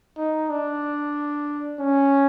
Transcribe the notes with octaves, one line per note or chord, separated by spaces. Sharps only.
D#4
D4
C#4